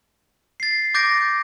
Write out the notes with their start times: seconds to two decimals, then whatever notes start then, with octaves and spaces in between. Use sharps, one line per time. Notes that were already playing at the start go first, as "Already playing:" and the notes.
0.60 A6 C7
0.94 D6 G6 A6 A#6 D7